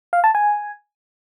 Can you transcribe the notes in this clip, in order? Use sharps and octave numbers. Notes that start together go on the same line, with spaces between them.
F5
A5
G#5